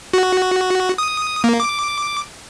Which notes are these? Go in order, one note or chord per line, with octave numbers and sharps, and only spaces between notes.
F#4
D#6
A#3
D6